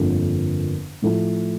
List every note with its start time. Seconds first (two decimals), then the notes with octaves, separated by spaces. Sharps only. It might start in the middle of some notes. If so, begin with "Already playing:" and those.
Already playing: G1 F2 D3 F3 A#3
1.02 A2 F3 A3